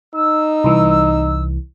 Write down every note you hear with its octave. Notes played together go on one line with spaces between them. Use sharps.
D#4 E6
C2 E3